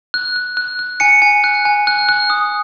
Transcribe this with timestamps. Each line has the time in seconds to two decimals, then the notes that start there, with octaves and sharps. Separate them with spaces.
0.14 F#6
0.36 F#6
0.57 F#6
0.79 F#6
1.00 G#5 C#7
1.22 G#5
1.44 F#6
1.65 G#5
1.87 F#6
2.09 F#6
2.30 D#6